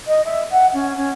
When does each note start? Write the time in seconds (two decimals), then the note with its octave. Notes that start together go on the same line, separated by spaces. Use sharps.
0.07 D#5
0.25 E5
0.51 F#5
0.73 C#4
0.97 C#4